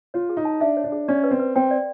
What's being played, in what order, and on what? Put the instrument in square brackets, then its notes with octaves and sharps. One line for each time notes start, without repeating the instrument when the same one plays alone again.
[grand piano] F4 [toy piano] C#5
[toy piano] G#4
[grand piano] D#4
[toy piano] A5
[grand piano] D4 [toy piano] E5
[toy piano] C#5
[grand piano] D4
[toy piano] G#4
[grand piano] C#4 [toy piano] D5
[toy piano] B4
[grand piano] C4
[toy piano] B4
[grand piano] C4 [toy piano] G5
[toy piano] D5